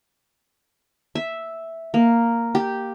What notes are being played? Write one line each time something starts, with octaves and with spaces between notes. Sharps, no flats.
E5
A#3
G4